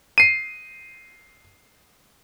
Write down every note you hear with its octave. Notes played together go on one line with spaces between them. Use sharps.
C7 D#7